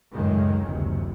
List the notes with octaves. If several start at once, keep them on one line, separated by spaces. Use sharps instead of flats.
C#2 F#2 A2 D#3 G#3
F#1 D2 C3